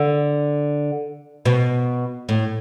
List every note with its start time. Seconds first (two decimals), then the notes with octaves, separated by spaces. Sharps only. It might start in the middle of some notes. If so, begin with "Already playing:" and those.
Already playing: D3
1.46 B2
2.29 A2